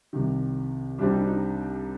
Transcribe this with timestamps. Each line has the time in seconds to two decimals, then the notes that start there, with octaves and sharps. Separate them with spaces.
0.13 C2 C3 D#3
0.98 C2 C3 G3 C4 D4
1.13 D#4
1.27 D#4